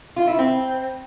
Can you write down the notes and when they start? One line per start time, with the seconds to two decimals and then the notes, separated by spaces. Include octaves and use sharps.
0.16 F4
0.27 E4
0.39 C4